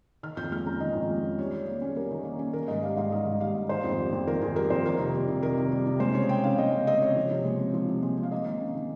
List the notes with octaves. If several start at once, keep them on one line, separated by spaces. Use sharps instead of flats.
D#3 F6
F2 G6
G#3 F6
C#4 A#5
D#3 D#5
F2
G#3
C#4
G3 C#5
D#3
A#3
C#4
G#4
G3 A#4
D#3
A#3
C#4
D#3 A#4
G#2 D#5
G3 F5
G#2 F5
D#3 D#5
G#2
G3 F5
G#2
D#3 C5
F2
G3
F2
D#3 A#4
F2 G#4
G3 A#4
F2 C5
D#3 A#4
C3
G3
C3
D#3 A#4
C3
G3
C3
G#3 C5
C#3 C#5
C4 G5
C#3 F5
G#3 D#5
C#3
C4 D#5
C#3 C#5
F3
C3
G#3
C4
F3
C3
G#3
C4
F5
A#3 D#5
D#3
C#4
D#3